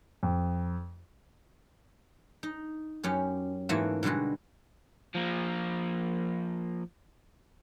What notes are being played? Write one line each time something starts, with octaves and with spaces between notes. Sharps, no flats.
F2
D#4
F#2 C#4 G4
G#2 E3 A3 A#3 F#4
B2 D3 G3 G#3 F#4
F3 A#3